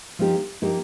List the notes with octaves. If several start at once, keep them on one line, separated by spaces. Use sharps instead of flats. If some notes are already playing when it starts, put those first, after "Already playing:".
F3 A#3 D#4 G4 A#4
F3 A#3 D#4 G4 A#4